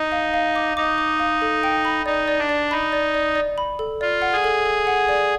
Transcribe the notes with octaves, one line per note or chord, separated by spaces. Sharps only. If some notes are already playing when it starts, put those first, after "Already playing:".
Already playing: D#4
F5
F5
D6
D#4 D6
D6
F5
A4
G5
B5
D#4 D5
D5
D4
D5
D#4 B5
D5
D5
D5
B5
A4
F4 D5
F#5
G#4
A4
A4
F#5
D5